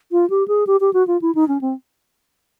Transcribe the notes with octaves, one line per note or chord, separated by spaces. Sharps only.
F4
G4
G#4
G4
G4
F#4
F4
E4
D#4
C#4
C4